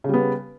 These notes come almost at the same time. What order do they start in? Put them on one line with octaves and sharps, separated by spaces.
C#3 G3 B3